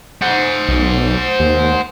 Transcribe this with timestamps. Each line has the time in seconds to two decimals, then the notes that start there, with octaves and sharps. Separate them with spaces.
0.22 C5 F#5
0.69 B1
1.40 D#2